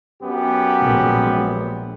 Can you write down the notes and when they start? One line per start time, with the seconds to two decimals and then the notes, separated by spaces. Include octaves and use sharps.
0.20 F#2 B3 G4
0.80 A#1 G#3